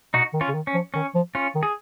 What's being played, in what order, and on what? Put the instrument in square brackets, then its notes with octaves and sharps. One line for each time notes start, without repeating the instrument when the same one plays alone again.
[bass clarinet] B2 [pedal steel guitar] D#4 F#4
[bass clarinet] D#3
[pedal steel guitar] C#4 F4
[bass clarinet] C#3
D#3
[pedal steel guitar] C#4
[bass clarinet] F3
[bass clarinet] D#3 [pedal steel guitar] C#4
[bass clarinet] F3
[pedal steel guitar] C#4 F4
[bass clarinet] D#3
[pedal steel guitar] G#4